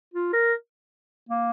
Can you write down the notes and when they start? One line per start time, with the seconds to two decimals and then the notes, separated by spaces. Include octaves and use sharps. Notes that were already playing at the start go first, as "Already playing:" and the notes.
0.14 F4
0.33 A#4
1.29 A#3